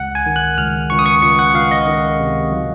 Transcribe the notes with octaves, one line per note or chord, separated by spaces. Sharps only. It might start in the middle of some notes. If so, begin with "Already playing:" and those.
Already playing: C#2 F#5
G#5
D#3
F#6
C#2 F6
C#2 C#6
D#6
C#6
C#2 C#6
F#5
C#2 F5
D#5
D#3
C3
F#3